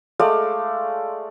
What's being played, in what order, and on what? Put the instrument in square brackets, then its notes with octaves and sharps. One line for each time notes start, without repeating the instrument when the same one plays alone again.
[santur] G#3 A3 D5 F5